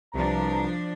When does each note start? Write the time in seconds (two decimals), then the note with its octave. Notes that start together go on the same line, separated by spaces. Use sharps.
0.14 C2 F3 D4 B4 A5 A#5